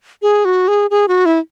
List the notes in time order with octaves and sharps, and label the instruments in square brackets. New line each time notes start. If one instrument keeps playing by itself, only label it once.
[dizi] G#4
F#4
G#4
G#4
F#4
E4